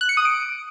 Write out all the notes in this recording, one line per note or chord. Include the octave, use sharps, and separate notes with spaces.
F#6
C#7
D#6
D7